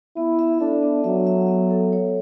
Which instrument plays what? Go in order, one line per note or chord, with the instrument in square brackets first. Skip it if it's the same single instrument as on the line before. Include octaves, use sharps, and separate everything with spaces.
[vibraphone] B3 [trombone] E4
[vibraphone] E5
[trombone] D4 [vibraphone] A4
[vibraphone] B3
[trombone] F#3 [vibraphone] E5
[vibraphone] E5
B3
A4
C#5